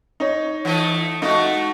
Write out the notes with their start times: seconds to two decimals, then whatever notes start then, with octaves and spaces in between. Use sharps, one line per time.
0.20 D#4 C#5
0.65 E3 A3 D#5
1.22 G#3 A3 D#4 F#4